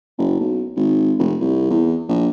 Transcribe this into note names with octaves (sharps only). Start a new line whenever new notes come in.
F#1
B1
G#1
F1
C2
E2
A#1